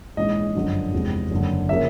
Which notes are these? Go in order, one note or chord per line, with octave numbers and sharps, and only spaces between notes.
A#1 G#2 E3 G#3 C#4 D#5
G1 F#2 D3 F3
E2 C3 F3 G#3 C4
F#1 F#2 D3
C#3 F3 A#3 E5